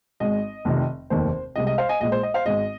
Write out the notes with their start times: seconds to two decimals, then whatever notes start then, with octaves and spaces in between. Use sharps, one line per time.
0.20 G#1 G#2 G#3 D#5
0.65 F1 F2 C3 D#3
1.10 F1 D#2 D#3 A#3 C5
1.56 C2 C3 G#3 D#5
1.67 D#5
1.78 C5 F5
1.89 D#5 G#5
2.01 A#1 A#2 G#3 D#5
2.12 C5
2.23 D#5
2.34 C5 F5
2.46 G#1 G#2 G#3 D#5